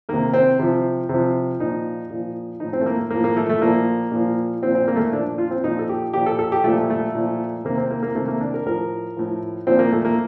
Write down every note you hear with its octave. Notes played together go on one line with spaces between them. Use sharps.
C3 D#3 A#3
C4
C3 F3
C3 F3
A#2 F3 D#4
A#2 F3
A2 F3 D#4
C4
A3
A#3
A2 F3 A#3
A#3
A3
A3
A#2 F3 A#3
A#2 F3
A#2 F3 C4
C4
A#3
A3
A#3
A#2 F3 D4
F4
C4
A#2 F3 D#4
A4
G4
A#2 F3 G4
A4
A4
G4
A#2 F3 A3
A3
A#2 F3
C3 D#3 A#3
C4
A#3
A#3
C3 D#3 A3
A#3
D4
A#4
A2 F3 A#4
A2 F3
A#2 F3 C4
A#3
A3
A#3